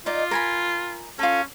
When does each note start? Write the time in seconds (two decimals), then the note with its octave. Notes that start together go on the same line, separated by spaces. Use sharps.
0.06 D#4 F4 D5 D#5
0.31 A#4 G#5 B5
1.19 C#4 F4 A4